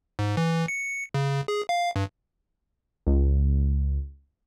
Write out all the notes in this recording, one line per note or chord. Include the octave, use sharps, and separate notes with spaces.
G#2
E3
C#7
C#3
G#4
F5
G2
C#2